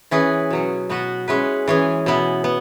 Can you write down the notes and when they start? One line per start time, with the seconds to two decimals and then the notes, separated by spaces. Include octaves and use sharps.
0.11 E3 C#4 E4 G#4 B4
0.50 B2 F#3 C#4
0.89 B2 B3 F#4 B4
1.28 G#3 C#4 E4 B4
1.68 E3 C#4 G#4
2.06 B2 B3 E4
2.44 B3